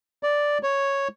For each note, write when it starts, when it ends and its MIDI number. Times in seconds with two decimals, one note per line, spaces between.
0.23 0.58 74
0.63 1.08 73